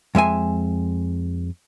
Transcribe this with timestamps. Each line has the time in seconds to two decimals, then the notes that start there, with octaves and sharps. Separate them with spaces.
0.15 F2 G#3 E5 G#5